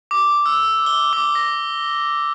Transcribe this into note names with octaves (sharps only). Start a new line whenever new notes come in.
D6
E6
G7
D6
A#6